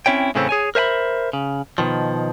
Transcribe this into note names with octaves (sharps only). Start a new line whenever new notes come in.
C4 C#4 E4 C#5 G5
A2 C#3 E3 A3 C4 C#4
G#4 C#5 G#5
A#4 C5 E5 G#5 B5
C#3
B2 D#3 F3